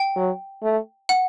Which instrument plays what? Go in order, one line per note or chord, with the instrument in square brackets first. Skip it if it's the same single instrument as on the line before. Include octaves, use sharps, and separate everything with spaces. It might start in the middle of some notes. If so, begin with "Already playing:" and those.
Already playing: [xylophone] G5
[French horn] F#3
A3
[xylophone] F#5